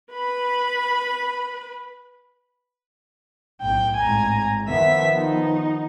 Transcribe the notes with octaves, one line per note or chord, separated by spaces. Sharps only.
B4 B5
B1 A2 G5
G#1 A2 G#5 A#5
D#3 F3 B3 E5 B6
D#4